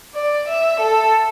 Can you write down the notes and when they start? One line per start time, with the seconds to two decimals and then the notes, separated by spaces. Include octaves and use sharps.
0.14 D5
0.47 E5
0.79 A4